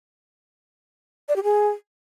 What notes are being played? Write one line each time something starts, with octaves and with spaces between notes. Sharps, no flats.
D5
G4
G#4